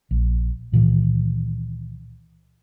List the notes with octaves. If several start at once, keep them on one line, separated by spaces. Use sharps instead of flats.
A#1
C#2 A#2 D#3 E3